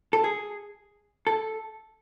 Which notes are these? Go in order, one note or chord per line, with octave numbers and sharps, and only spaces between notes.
A4
G#4
A4